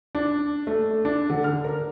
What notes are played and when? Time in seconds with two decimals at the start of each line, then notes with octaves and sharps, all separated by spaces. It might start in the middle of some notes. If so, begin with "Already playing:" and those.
0.15 D4
0.67 A3
1.05 D4
1.30 D3
1.44 F6
1.64 A#4